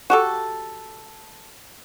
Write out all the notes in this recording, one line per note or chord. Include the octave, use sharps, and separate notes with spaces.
F#4 G4 A4